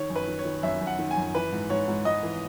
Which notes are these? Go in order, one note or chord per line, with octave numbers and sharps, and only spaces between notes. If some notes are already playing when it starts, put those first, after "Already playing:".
Already playing: D#3 C#5
F#2
B4
D#3
C#5
D#3
F#2 E5
F#2
F#5
D#3
G#5
F#2
E3 B4
G#2
G#2 C#5
G#2
G#2 D#5
E3